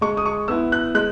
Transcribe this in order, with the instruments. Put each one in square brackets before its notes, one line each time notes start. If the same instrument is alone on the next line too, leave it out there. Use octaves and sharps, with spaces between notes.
[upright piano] G#3 [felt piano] C#6
[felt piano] D#6
C#6
[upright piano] B3 E4 [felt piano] E6
[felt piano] F#6
[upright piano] G#3 [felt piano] F#6